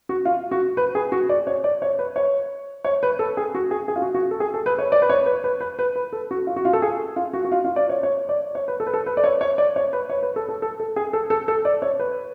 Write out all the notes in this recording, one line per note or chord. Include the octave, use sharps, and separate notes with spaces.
F#4
F4
F#4
B4
G#4
F#4
D5
C#5
D5
C#5
B4
C#5
C#5
B4
A4
G#4
F#4
G#4
G#4
F4
F#4
F#4
A4
G#4
A4
B4
C#5
D5
B4
C#5
B4
B4
B4
B4
B4
A4
F#4
F4
F#4
F4
A4
G#4
F4
F#4
F#4
F4
F4
D5
C#5
C#5
D5
C#5
B4
A4
B4
A4
B4
D5
C#5
C#5
D5
C#5
B4
C#5
B4
A4
A4
A4
A4
G#4
A4
A4
A4
D5
C#5
B4